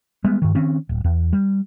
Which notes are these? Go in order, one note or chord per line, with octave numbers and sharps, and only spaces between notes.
G3 G#3 B3
G2 D#3
D#3 C4 C#4
D1
E2
G3